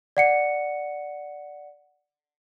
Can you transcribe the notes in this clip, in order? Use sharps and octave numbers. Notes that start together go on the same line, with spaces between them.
D5 F#5 C#7